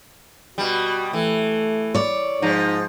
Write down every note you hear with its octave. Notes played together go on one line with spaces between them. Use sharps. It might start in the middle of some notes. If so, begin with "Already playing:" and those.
B2 G3 F#4
E3 A3
C#5 D5
G#2 F3 D#4